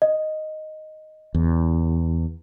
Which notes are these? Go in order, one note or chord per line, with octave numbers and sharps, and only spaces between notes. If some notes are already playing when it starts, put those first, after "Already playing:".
D#5
E2